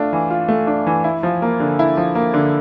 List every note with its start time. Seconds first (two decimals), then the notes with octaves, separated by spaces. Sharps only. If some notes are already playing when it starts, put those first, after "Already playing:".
Already playing: A3 D4 F4
0.13 E3
0.30 F4
0.49 A3
0.67 D4
0.87 E3
1.04 E4
1.23 F3
1.42 A#3
1.60 D3
1.79 E4
1.97 F3
2.15 A#3
2.34 D3